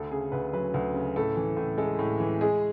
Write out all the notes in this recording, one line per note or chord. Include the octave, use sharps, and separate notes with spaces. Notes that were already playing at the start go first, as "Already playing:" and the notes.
Already playing: D2 A4
C#3 G#4
D2 B4
F#3 B4
D2
C#3
A2 A4
E3
A2
G#3 A4
A2
E3
G#3 G#4